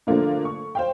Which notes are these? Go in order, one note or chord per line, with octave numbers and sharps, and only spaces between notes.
D3 F3 A3 A#3 D4
C#6
C5 F5 G5